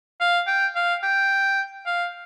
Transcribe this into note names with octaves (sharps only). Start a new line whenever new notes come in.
F5
G5
F5
G5
F5